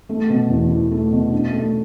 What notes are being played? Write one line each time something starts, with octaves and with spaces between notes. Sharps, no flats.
A3
B2
E2
E4
A3
B2
D4
A3